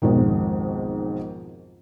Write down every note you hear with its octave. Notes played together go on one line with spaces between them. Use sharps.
B1 F2 G#2 D#3